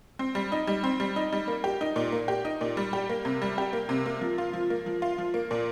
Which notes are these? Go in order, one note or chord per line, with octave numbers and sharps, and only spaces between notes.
C4
G3
D#4
G3
C4
G3
D#4
G3
A#3
G4
D#4
A#2
A#3
G4
D#4
A#2
G3
G4
A#3
C3
G3
G4
A#3
C3
A#3
F3
F4
F3
A#3
F3
F4
F3
A#3
A#2